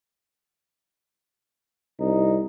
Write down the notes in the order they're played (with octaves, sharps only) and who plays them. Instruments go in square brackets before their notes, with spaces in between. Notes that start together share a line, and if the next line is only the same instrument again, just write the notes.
[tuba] C2 [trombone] D#4